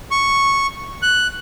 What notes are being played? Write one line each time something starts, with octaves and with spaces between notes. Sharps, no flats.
C#6
F#6